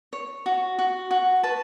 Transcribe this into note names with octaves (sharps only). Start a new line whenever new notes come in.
C#5
F#4
F#4
F#4
B4 A5